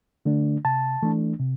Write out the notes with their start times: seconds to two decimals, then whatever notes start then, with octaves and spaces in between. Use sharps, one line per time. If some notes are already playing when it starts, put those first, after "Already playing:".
0.25 D3 A3 D4
0.65 C3 A5
1.02 E3 A3 D4
1.40 C3